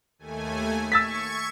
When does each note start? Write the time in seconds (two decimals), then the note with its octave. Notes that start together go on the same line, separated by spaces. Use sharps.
0.19 D#2 A3 G#5
0.92 C#6 E6 G#6 A6 B6